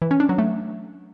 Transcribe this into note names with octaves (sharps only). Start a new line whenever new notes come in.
E3
C#4
D4
F#3
A3